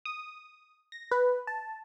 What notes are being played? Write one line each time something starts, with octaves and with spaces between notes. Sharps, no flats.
D#6
A#6
B4
A5